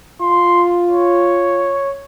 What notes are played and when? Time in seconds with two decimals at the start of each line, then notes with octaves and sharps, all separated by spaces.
0.21 F4 C6
0.90 C#5